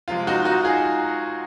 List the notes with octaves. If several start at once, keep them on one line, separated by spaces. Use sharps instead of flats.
C3 F3 G#3 F4
D#4 F#4
D#4 F#4
F4 G#4